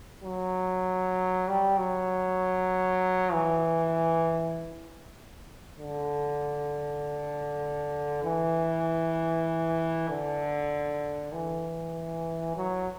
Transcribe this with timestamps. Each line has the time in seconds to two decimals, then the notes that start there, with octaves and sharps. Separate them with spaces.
0.24 F#3
1.48 G3
1.78 F#3
3.33 E3
5.78 D3
8.24 E3
10.09 D3
11.32 E3
12.56 F#3